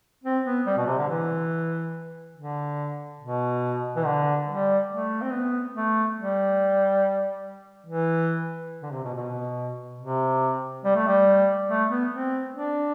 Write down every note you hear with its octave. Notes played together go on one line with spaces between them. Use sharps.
C4
B3
G3
B2
C3
D3
E3
D3
B2
E3
D3
G3
A3
C4
B3
A3
G3
E3
D3
C3
B2
B2
C3
G3
A3
G3
A3
B3
C4
D4